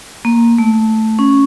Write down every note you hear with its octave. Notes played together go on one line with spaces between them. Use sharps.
A#3
A3
C#4